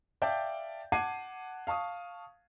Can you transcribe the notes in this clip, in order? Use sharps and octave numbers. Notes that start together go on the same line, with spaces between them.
D5 E5 F5 G5 A5 G6
F#5 A5 D6 G#6 C7 D#7
F5 A5 C#6 D#6